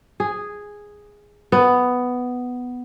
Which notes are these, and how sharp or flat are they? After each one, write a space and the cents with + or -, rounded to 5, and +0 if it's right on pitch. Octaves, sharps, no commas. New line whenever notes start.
G#4 -5
B3 +5